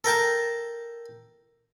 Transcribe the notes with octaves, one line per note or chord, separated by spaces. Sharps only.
A4 A#4 G5 A5